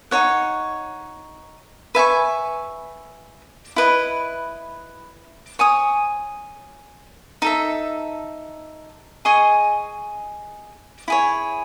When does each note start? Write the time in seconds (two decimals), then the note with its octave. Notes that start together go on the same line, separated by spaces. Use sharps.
0.11 D#4 F#4 C#5 F#5
1.95 B4 E5 G#5 C#6
3.76 E4 B4 D#5
5.59 C#5 G#5 D#6
7.42 D#4 A4 E5
9.25 G#4 D#5 G#5 C#6
11.08 E4 G#4 C#5